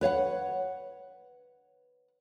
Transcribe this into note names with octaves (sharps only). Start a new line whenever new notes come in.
B4 C#5 F5 F#5